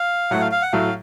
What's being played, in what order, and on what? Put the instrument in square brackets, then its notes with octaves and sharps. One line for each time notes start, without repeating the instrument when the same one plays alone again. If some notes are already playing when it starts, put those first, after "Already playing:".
Already playing: [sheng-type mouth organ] F5
[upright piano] A2 F#3 A3 [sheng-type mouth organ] F#5
[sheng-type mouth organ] F5
F5
F#5
[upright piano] A2 F#3 A3 [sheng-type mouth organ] F5